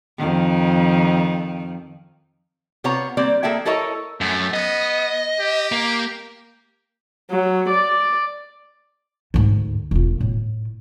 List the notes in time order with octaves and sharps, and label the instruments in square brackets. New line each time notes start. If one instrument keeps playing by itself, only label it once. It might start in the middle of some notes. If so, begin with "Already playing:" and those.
[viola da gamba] F2 D#3
[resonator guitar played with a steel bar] C3 B3 F4 C#5 A#5
G3 A#3 C4 D5
A#3 G#4 A4 E5 G5
E4 A4 A#4 C#5 D#5 E5
[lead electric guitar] F#2 [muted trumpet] A3
[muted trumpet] B3 [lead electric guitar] D#5
[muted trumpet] G4
[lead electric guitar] A#3
[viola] F#3
D5
[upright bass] D2 G#2
E1 F4
A2